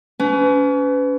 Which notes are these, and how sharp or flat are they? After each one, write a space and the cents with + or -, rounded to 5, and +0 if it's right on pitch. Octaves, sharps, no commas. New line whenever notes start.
C#4 +35 B4 +30